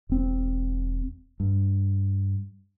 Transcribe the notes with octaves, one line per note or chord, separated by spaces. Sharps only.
E1 C4
G2